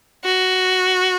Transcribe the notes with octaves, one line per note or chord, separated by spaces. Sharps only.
F#4